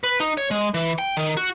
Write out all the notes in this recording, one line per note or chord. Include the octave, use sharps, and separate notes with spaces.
B4
D#4
C#5
G#3
E3
G5
D#3
F#4